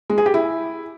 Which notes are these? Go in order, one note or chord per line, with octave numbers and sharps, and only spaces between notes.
G#3
G#4
G4
E4